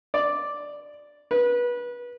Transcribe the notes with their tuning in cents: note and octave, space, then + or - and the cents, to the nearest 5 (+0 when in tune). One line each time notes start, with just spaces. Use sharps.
D5 +0
B4 -25